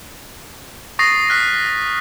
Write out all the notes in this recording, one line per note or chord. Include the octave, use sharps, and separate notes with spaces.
C#6 D#6 A6 A#6 C7
F6 F#6 A#6 B6